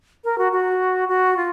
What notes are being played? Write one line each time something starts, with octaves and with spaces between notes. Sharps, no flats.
A#4
F#4
F#4
F#4
F4